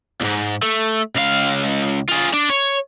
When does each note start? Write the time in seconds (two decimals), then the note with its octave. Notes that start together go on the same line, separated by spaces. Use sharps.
0.21 D#2 G#2
0.62 A3
1.16 C#2 F5
2.09 F4 G#4
2.34 D4
2.50 C#5